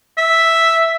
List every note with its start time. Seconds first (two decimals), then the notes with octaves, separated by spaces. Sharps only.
0.18 E5